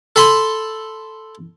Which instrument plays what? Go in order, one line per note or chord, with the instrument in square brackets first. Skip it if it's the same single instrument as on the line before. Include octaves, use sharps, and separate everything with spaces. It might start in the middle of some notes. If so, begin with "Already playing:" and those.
[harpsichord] A4 A5 B5 C6